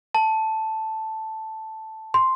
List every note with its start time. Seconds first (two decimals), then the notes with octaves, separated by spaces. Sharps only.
0.15 A5
2.14 C6